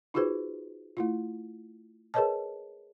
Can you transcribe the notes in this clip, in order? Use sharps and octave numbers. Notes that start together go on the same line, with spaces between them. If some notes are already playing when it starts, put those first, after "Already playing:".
D#4 F4 F#4 G#4 B4 C5
A3 E4 F4
G#4 A#4 B4 C#5 D#5 A5